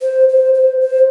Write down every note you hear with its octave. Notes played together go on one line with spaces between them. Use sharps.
C5
C5
C5
C5